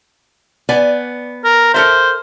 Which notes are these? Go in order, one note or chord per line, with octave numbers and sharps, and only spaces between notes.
B3 D5 G#5
A#4
A4 A#4 C5 E5